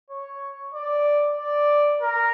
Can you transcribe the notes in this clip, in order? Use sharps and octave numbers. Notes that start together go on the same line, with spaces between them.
C#5
D5
D5
A#4